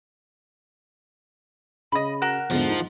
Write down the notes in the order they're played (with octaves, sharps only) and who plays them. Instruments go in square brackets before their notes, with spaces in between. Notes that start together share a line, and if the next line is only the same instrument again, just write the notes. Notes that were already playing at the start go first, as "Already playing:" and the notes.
[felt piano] C#3 [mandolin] D#5 B5
[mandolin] F#4 A#4 F#6
[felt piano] E2 G#2 D3 [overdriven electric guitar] F3
[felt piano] D#4